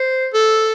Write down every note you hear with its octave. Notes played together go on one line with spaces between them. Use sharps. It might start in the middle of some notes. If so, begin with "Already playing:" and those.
Already playing: C5
A4